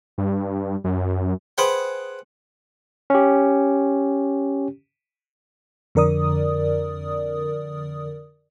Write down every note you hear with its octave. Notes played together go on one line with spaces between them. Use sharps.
G2
F#2
G#4 B4 C5 F#5 G5
C#4 G4
F2 D3 A#4 D5 D#6